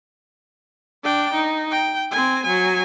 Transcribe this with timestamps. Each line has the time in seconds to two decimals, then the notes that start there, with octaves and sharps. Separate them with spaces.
1.04 D4 G5
1.34 D#4
1.71 G5
2.11 C4 G#5
2.43 F#3 G#5